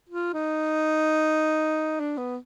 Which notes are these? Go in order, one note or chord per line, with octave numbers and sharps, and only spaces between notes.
F4
D#4
D4
B3